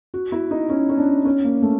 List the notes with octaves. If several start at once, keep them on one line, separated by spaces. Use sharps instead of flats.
F#4
E4
D#4
C#4
C#4
D4
C#4
A#3
A3